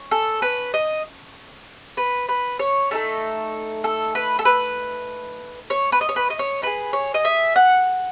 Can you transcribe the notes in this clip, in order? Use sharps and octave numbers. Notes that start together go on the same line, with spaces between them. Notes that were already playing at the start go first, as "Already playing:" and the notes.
Already playing: C#4
A4
B4
D#5
B4
B4
C#5
A3 D#4 A4
A4
B4
A4
B4
C#5
B4
D#5
C#5
B4
D#5
C#5
D#4 G#4 B4
C#5
D#5
E5
F#5